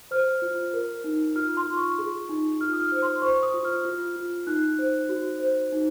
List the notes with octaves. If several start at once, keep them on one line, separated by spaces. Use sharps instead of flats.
C5 F6
F4
A#4
D#4
F4 F6
C6
F4
C#6
G#4
D#4
F4 F6
D#6
F6
C5
C6
C5 C#6
D#6
F4
F6
F4
F4
D#4 F#6
C5
F#4
C5
D#4